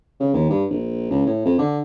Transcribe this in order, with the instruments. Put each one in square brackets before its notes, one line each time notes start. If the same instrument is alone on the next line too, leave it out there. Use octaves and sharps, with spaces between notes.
[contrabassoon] C#3
D#2
G2
A#1
C#2
A2
F2
D3